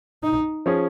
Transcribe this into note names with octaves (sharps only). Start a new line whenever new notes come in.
D#4
F3 C#4 G#4